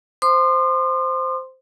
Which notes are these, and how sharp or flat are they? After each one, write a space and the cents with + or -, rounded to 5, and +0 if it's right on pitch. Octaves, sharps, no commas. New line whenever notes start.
C5 -5 C6 +0 D#6 -45